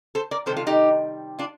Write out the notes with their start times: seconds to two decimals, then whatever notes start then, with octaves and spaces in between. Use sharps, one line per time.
0.15 A4 C5
0.31 A#4 D5
0.46 C3 D#3 G3 A4 C5
0.57 F4 A4
0.67 D#4 G4
1.39 D4 F4